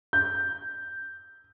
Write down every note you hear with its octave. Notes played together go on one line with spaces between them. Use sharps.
G6